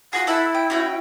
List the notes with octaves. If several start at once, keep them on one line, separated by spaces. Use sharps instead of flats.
F4 F#4 G#4 F#5
E4 A4 E5 F#5
G5
C#4 F#4 G5